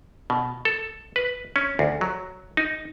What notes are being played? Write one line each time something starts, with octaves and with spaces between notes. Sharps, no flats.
B2
A4
B4
C#4
D2
F#3
D#4